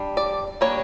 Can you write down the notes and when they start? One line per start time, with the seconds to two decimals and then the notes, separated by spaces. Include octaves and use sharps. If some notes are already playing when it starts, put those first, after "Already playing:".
Already playing: G3 D4
0.17 D5
0.61 G3 A#3 D4 C#5